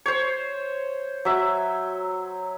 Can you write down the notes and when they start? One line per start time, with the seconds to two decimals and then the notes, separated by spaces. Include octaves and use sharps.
0.06 C5 C#5
1.25 F#3 E5